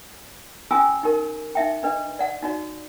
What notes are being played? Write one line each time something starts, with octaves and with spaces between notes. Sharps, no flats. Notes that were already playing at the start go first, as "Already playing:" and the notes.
C#4 F4 G4 G#5 D#6 E6
D#4 G4 A#4
D#4 E5 G5
D4 B4 D#5
D5 F#5
D#4 F#4 D5